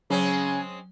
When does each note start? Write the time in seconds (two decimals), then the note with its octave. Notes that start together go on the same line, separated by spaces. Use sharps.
0.10 C#3 F#3 G#3 C4 C#4 G#5